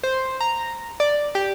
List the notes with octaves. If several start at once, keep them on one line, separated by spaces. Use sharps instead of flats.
C5
A#5
D5
G4